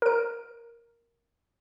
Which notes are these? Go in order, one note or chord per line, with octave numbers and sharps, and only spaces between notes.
A#4 D7